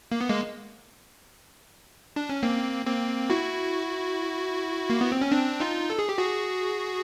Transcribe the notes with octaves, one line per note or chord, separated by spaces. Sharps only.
A#3
B3
G#3 A#3
D4
C#4
A#3 C4
A#3 C4
E4 F#4
A#3
B3
C4
C#4
C4 D4
D#4 F4
A4
G#4
G4
F#4 G#4